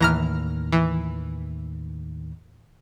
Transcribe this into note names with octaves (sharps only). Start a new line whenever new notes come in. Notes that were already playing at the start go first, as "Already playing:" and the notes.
D#2 A2 D#3 E3 A#5 F6
E3